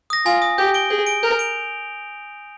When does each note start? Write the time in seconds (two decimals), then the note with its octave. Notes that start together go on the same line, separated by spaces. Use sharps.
0.10 D#6 A#6
0.25 F4 G#5
0.42 D#6 A#6
0.58 G4 G6
0.74 D7 G7
0.90 G#4 G6
1.07 D7 G7
1.23 A#4 G6
1.39 D7 F7